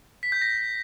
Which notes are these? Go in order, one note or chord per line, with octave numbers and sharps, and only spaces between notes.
B6
G6
A#6